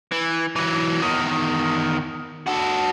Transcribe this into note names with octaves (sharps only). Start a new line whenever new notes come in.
E3
E3 F#3
E2 D#3
F#4 A4